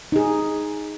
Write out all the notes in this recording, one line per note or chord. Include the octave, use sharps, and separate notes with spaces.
D#4 G#4